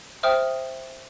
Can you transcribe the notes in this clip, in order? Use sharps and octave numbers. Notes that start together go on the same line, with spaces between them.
C5 E5 G5 D#6 F6